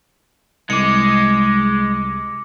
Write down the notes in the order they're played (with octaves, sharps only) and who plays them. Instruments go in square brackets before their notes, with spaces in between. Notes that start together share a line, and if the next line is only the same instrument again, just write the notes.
[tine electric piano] C2 [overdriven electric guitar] G#3 [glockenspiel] D6 C#7